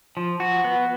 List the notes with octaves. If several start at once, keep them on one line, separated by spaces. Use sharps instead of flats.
F3
F#4
B3